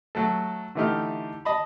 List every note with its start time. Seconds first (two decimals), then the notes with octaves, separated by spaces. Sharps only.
0.15 F#3 A3 A4
0.75 D3 E3 A3 D#4 G4 F6
1.45 D#5 A5 B5